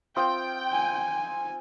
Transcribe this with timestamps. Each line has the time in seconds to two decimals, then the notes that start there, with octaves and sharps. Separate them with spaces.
0.16 C4 F4 G5 D#6
0.73 G#5